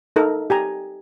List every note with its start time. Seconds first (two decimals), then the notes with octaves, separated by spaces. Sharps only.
0.16 D#4 A4 A#4
0.50 G4 G#5 A#5